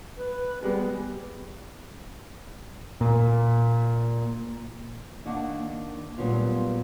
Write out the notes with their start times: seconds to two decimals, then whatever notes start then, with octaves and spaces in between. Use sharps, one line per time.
0.17 B4
0.63 G3 G#3 B3
3.01 A#2
5.26 D#3 A#3 D4 F#5
6.18 A#2 F#3 G3 B3 C#4 F4